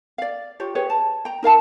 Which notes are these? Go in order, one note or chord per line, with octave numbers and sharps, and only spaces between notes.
D5 F5
F4 G4 C#5
G4 G#4 B4 C#5
A5
G5 A#5
D#4 A#4 F5 A5